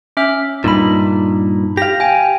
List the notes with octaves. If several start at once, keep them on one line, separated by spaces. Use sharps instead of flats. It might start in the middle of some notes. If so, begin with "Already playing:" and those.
C#4 E5 F6
G2 A#2 D#4 B5
G4 F5 A#6
G5 G#5